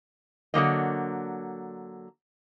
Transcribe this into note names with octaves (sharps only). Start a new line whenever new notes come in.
D3 F#3 A#3 D#5